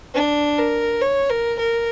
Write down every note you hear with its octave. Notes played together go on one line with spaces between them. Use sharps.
D4
A#4
C#5
A#4
A#4